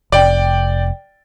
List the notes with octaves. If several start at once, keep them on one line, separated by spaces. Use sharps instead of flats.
F1 D5 G5